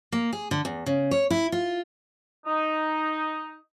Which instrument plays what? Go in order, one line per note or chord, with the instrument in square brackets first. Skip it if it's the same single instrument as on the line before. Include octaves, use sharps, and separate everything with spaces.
[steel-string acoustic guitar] A#3
G#4
D3
E2
C#3
C#5
E4
F4
[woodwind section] D#4